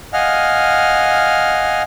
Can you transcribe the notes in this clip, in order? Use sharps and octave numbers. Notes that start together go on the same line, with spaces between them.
D#5 F5 F#5 G#5 F6